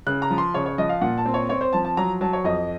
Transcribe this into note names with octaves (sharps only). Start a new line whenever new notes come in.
C#3 F#6
A#5
F3
C6
C#3 C#5
C#5
F3 D#5
F5
A#2 F#5
A5
C4
C#5
C4 C#5
C5
F3 A5
A5
F#3 A#5
F#3 A5
C#5
F2 D#5